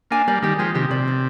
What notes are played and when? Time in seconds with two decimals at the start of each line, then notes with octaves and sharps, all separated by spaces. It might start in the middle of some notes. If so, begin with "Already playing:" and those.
0.11 A#3 D4 G#5
0.28 G3 A#3 D5
0.42 D#3 G3 G4
0.59 F3 G#3 G4
0.75 C3 D#3 G4
0.90 C3 D5
1.08 D5